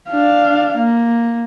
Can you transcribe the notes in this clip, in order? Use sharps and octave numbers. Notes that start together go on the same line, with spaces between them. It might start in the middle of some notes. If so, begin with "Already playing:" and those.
D4 F5
A#3